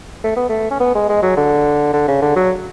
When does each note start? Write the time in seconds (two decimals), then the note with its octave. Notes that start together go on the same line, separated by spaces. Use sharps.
0.24 A3
0.36 B3
0.49 A3
0.71 C#4
0.80 B3
0.95 G#3
1.09 G#3
1.22 F#3
1.37 D3
1.93 D3
2.08 C#3
2.22 D3
2.36 F#3